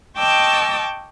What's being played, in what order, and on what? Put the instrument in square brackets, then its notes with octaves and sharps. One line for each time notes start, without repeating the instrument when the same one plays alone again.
[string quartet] D#5 G5 A5 C#6 D6 E6